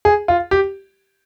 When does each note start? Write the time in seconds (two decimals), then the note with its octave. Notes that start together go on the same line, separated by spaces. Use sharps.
0.05 G#4
0.28 F4
0.51 G4